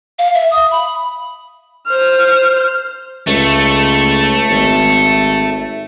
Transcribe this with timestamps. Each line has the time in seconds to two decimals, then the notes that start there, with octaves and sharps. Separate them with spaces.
0.19 F5
0.34 E5
0.51 D#6
0.71 B5
1.87 C5 F6
3.27 C#2 A3
4.50 G#1